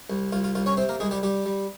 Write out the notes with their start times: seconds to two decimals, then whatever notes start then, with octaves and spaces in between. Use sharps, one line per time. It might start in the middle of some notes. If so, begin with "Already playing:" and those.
0.10 C2
0.32 C2 F4
0.44 F4
0.55 C2 F4
0.66 C#4 C#5
0.77 C3 C4 C5
0.89 A#3 A#4
1.00 C2 G#3 G#4
1.11 G3 G4
1.23 G3 G4
1.46 G3